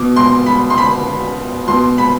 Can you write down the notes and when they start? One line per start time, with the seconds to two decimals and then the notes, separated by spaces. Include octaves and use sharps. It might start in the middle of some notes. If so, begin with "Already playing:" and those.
Already playing: B2 D6
0.16 C6
0.46 B5
0.70 C6
0.78 B5
1.67 B2 C6
1.98 B5